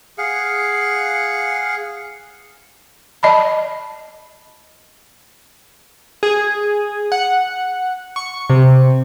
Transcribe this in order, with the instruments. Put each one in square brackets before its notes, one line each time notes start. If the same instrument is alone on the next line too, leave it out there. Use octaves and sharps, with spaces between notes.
[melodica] G#4 F5 F#5
[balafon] D5 D#5 A5 B5
[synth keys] G#4
F#5
C#6
C3